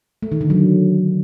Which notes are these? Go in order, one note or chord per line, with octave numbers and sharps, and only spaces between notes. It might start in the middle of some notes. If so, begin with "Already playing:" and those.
A3
D#3
D3
F#3